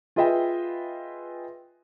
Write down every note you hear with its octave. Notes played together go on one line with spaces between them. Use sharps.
F4 G#4 B4 D#5 E5 G5